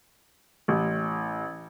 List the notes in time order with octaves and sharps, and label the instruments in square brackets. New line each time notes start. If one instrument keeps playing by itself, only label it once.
[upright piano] A1